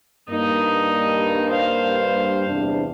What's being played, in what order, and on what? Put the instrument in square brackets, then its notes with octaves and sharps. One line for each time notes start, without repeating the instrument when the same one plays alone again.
[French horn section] G2 [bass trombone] A#3 [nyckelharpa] D#4 D#5
[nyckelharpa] C5 F5
[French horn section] E2 C3 D4